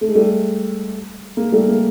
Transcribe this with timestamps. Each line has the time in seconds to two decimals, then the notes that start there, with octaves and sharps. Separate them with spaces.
0.01 A3
0.08 G#3
0.15 G3 A3
1.37 G#3 A#3
1.52 G3 A3
1.68 G#3 A#3